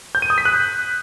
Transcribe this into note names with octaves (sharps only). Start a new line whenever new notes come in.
G6
D#7
D#6
B6
F#6